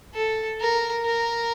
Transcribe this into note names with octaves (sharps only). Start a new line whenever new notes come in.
A4
A#4
A#4